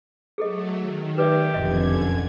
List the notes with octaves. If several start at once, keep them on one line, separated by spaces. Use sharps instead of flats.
F#3 A3 G#4 A4 D#5
D#3
G4 B4 D5 E5
F1 B1 F2 D3 D#5 G#6
F#2